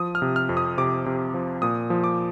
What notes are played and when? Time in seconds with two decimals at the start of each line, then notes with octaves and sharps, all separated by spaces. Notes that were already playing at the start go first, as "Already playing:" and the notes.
Already playing: F3 D#6
0.15 F6
0.22 C3
0.36 F6
0.49 F2
0.57 D#6
0.78 C3 D6
1.06 C3
1.34 F3
1.62 A#2 D#6
1.90 F3
2.04 D6